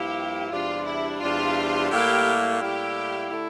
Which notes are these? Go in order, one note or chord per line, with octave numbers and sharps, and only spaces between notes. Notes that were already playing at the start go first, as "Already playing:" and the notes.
Already playing: G2 F3 A#3 E4 G4
E2 C3 G3 D4 F4
E4
E2 C3 G3 D4 F4
A2 G3 A#3 E4 G4
A2 G3 A#3 E4 G4
D3 A3 E4